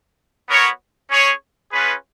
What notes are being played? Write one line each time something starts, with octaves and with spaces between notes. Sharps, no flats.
B3 F#4 A#4 C#5
C#4 G#4 C#5
C#4 F4 G#4 B4